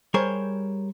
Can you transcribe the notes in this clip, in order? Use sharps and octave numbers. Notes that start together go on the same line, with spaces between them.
G3 G#4 A#4 C5 C#5